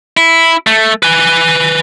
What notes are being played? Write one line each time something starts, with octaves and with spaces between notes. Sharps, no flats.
E4
A3
B4 G#5